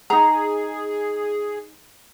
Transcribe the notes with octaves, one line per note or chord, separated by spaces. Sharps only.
D#4 G#4 A#5